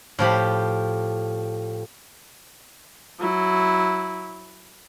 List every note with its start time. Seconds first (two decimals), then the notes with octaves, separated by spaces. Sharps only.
0.19 A2 F3 G4 B5
3.19 F#3 E4